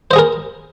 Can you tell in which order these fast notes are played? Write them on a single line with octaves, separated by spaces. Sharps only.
C5 D#5 G#4 A#4